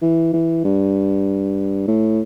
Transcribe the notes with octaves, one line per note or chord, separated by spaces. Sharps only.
E3
E3
G2
A2